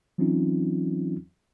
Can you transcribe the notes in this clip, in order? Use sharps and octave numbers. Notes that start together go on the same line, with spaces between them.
E3 F#3 C4 C#4 D#4 F4